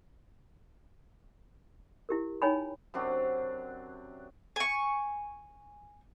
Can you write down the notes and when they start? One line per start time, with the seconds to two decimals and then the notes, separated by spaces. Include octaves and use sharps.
2.09 E4 G4 A#4
2.42 D#4 C#5 G5 G#5 A#5 B5
2.94 F#2 C3 D4 F#4
4.56 G#5 C#6